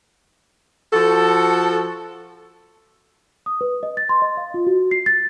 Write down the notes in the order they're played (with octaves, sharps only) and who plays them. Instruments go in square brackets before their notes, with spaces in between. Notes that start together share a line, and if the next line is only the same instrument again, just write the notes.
[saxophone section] F3 F#4 A4
[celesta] D#6
B4
D#5
A6
C6
D#5
F5
F4
F#4
C7
A6